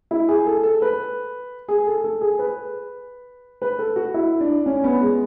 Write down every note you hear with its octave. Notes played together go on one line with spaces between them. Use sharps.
E4
G#4
A4
A4
B4
G#4
A4
A4
G#4
B4
B4
A4
F#4
E4
D4
C#4
B3
G#3